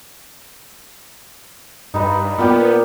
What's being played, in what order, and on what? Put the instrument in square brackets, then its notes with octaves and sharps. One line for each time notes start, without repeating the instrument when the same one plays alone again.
[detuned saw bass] G2 [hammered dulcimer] D#4 B4
[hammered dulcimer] A#2 G4 [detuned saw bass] B3